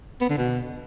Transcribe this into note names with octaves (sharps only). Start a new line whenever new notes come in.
B3
D3
B2